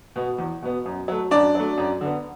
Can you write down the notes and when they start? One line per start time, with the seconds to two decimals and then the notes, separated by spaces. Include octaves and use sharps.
0.16 B2 B3
0.39 E2
0.62 B2 B3
0.86 F#2
1.08 F#3 A3
1.31 F#2 D4 D5
1.55 F#3 A3
1.78 F#2
2.01 D3 B3